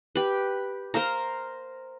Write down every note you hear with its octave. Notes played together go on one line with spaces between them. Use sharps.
G4 B4
A#4 C5 F5 A#5